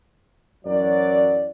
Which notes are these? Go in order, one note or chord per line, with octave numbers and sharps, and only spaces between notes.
F#2 E3 F#3 D5